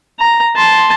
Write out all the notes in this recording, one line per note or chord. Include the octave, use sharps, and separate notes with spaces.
A#5
A5 C6